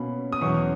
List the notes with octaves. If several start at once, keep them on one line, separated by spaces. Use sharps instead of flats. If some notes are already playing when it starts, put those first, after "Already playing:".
Already playing: B2 A#3 C#4 B5
D#6
E2 B2 F#3 C#4 C#6